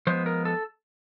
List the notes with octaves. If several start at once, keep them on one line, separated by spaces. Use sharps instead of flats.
F3 G#3 B3 C5
A#4
A4